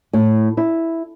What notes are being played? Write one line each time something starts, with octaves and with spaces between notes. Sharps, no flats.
A2
E4